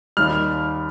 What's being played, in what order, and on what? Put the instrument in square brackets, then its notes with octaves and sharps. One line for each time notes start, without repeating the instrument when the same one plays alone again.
[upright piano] D#2 D#3 G3 F6